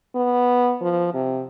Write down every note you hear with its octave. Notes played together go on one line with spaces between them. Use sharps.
B3
F3
C3